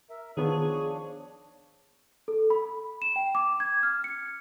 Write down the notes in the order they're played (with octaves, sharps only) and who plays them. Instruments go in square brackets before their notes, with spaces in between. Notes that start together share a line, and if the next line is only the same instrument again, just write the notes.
[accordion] A#4 E5
[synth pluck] D#3 B3 [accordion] F3 D4 C#5 [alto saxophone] G#4
[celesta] A4
B5
E7
G5
D6
G#6
F6
C#7